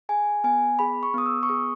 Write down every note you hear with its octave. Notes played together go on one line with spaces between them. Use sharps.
G#4 G#5
B3 G#5
G#4 B5
C#6
B3 D#6
E6
C#6
G#4 D#6